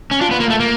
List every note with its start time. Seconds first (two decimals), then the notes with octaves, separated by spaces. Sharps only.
0.11 C#4
0.21 D4 F4
0.31 B3
0.40 A#3
0.50 A3
0.60 A#3